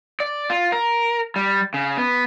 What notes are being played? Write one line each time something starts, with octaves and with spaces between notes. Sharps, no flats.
D5
F4
A#4
G3
C#3
B3